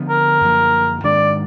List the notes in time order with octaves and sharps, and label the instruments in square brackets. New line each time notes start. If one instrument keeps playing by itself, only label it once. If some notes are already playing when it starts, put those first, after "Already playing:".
Already playing: [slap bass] D3 F3 B3 D4
[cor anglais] A#4
[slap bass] F#2 D3 F3 A#3
[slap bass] G#2 D#3 G#3 D4 [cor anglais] D5